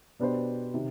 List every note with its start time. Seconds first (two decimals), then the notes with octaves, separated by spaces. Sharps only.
0.20 B2 B3 D4 G4 C5
0.74 C3 D#3